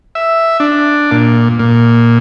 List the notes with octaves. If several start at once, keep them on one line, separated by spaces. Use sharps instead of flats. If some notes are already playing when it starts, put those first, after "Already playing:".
E5
D4
A#2
A#2